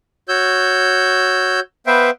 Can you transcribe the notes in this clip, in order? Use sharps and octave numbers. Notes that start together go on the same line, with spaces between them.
F#4 C#5 E6 G6
B3 B4 C5 E5 F5 G5